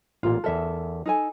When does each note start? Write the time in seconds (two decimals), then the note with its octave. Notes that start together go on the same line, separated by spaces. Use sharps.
0.23 A1 A#2 F4
0.44 E2 A4 A#4 E5
1.06 D#4 A4 G#5